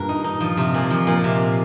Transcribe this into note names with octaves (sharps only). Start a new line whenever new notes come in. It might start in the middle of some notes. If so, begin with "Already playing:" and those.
Already playing: G2 A#2 A#4
D#4
D#4
F3
C3
A#2
F3
A#2
C3